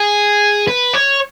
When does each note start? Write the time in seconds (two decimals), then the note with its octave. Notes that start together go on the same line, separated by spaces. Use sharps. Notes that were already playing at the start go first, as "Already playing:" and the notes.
Already playing: G#4
0.67 B4
0.93 C#5